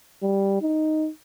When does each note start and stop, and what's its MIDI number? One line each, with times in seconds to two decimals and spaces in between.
0.23 0.57 55
0.61 1.09 63